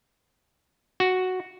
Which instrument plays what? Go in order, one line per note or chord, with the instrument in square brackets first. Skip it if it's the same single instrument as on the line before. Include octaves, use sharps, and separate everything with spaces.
[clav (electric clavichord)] F#4